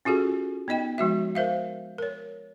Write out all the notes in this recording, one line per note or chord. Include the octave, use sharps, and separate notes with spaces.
C#4 F4 F#4 G#4 A4
B3 D#4 D#5 G5
F3 G#3 F#4 E5
A#4 C5 E5 F5
A#4 C#5